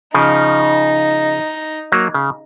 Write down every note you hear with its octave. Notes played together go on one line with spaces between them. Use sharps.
C#3 F3 D#4
F#3 A#3
C#3